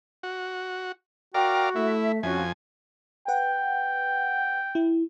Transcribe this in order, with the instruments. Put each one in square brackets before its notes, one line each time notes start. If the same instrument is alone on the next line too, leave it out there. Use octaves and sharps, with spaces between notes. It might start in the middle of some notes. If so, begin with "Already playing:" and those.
[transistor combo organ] F#4
[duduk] F#4 [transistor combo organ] A#4 D5 F5 [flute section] G5
[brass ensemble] A3 [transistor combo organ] E4 [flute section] E5
[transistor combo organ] F2 G#5 [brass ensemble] C4 C#4 F4 [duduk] F#4
[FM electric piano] B4 F#5 [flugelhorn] G5
[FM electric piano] E4